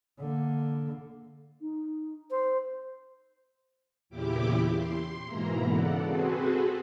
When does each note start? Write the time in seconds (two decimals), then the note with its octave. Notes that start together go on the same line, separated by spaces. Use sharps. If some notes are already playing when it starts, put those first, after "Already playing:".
0.19 D3 A#3
1.61 D#4
2.31 C5
4.10 E2 A#2 C#3 E4 G4 D6
4.75 C6
5.27 G#2 B2 E3 A#3 E4 A#5
5.65 C#3 A4 D5 F#5
6.04 C4 F#4 G#4 A4 B4 C5